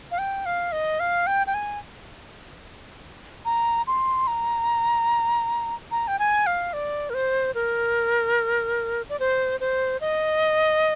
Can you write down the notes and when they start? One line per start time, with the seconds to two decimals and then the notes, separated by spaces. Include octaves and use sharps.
0.11 F5
0.18 G5
0.46 F5
0.72 D#5
1.00 F5
1.27 G5
1.47 G5
1.54 G#5
3.45 A#5
3.87 C6
4.27 A#5
5.91 A#5
6.08 G5
6.19 G#5
6.47 F5
6.73 D5
7.10 A#4
7.14 C5
7.55 A#4
9.09 D5
9.20 C5
9.60 C5
10.01 D#5